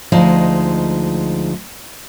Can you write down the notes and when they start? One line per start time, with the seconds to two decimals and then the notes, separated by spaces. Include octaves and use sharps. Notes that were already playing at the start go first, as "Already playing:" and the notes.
0.12 D2 F3 G#3 D#4